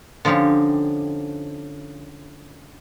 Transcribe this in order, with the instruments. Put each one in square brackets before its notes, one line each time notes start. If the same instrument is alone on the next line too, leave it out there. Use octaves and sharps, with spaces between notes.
[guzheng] D3 F3 C#4 D#4 G4